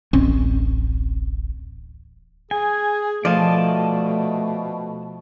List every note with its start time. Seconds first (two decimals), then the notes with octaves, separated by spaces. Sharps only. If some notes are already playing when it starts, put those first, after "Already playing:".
0.13 D1 A1 C4 C#4
2.51 G#4 G#5
3.25 B2 F3 A3 D5 D#5 A5